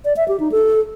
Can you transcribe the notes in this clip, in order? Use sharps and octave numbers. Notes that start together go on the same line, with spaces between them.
D5
E5
G4
D#4
A4